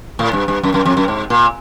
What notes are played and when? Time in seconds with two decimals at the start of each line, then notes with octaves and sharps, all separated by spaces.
0.19 A2
0.33 G2
0.48 G2
0.63 F#2
0.74 F#2
0.85 F2
0.97 F#2
1.08 G#2
1.30 A#2